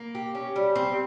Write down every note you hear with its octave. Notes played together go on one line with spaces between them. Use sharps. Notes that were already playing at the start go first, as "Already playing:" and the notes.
Already playing: A#3
G4
C#4
G3
C4